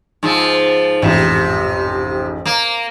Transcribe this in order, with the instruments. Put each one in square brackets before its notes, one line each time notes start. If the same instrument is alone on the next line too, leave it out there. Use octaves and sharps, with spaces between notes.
[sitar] G#2 F3
[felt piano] A1 F2 G#2 [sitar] C3
[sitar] A#3